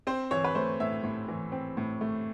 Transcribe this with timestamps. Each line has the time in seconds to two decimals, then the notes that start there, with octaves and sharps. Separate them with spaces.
0.07 C4 C5
0.31 E3 C#5
0.44 B4
0.55 A3 C5
0.80 A2 E5
1.04 A2
1.28 E3
1.52 C4
1.77 A2
2.01 A3